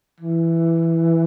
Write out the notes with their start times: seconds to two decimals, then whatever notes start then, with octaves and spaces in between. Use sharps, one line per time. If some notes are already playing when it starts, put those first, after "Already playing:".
0.20 E3